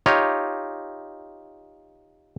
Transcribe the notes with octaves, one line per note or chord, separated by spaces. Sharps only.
D#4 F4 G4 C#5